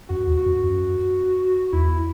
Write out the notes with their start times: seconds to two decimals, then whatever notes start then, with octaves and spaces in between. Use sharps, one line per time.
0.09 F#2 F#4
0.27 E2
0.37 F#4
0.46 F#2
0.63 F#2
1.72 E2 E4